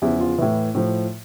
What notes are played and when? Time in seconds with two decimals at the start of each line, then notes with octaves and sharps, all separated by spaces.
0.02 E2 C#3 F3 E4
0.20 F4
0.38 A2 E3 E4
0.75 A2 F3